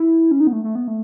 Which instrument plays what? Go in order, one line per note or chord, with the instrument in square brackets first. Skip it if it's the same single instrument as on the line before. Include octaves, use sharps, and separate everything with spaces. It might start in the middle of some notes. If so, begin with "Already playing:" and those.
Already playing: [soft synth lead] E4
C#4
D#4
B3
A3
A3
B3
A3